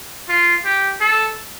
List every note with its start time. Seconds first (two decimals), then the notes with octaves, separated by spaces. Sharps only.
0.29 F4
0.65 G4
1.01 A4